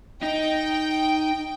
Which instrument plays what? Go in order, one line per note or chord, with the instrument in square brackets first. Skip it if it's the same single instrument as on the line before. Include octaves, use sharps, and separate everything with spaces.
[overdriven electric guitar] D#4 [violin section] G5